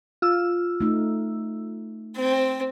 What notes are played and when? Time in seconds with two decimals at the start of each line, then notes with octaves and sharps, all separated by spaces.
0.22 F4 E6
0.81 A3 D#4
2.17 C4